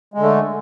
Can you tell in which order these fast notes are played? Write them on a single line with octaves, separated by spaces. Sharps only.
G#3 D3 A3